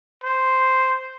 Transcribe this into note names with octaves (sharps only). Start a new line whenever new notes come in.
C5